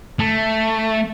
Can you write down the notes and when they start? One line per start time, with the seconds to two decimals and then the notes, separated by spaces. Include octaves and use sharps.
0.19 A3